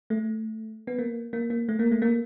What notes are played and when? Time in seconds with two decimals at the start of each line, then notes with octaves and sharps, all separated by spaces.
0.10 A3
0.87 B3
0.98 A#3
1.33 A#3
1.50 A#3
1.69 A3
1.79 A#3
1.91 A3
2.02 A#3